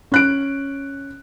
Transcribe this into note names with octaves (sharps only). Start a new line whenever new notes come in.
C#4 F#6 D7